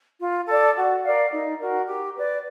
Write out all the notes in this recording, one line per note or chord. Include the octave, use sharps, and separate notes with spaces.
F4
A4 D5
F#4
A#4 D5 F5
D#4
F#4 A#4
G4
B4 D5